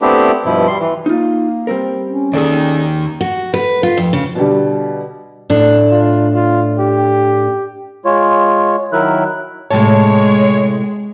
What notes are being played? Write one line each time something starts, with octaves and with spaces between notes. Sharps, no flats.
A3 B3 C4 D4 E4 G4
G2 B2 F3 E4
G3 C6
E3
A#3 D#4 F4
G3 C4 A#4
C#4
D#2 D#3 G#4 A4 D5
F#4
B4
F4
F2
C#3
B2 D3 G3
A2 D4
F4
F4
G4
G#3 F4 C#5
D#3 F#3 E4 A#4 E5 F#6
A2 C3 G#3 C#5 A5